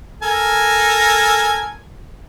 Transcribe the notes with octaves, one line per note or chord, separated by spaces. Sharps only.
A4 A#4 G#5